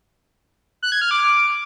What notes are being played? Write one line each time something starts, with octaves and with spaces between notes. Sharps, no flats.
F#6
G#6
F6
D6